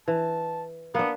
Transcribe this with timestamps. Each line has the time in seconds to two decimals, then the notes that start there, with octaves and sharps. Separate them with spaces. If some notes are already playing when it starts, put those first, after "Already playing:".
0.08 E3 A5
0.95 A#3 B3 D4